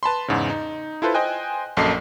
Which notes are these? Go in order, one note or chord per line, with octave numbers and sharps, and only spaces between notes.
B4 A5 B5 C6
E2 G#2 C#3
D#4
E4 F4 A4 B4 C5
C5 D#5 G5 G#5 F#6
A#1 F#2 A#3 A4 D#5 C7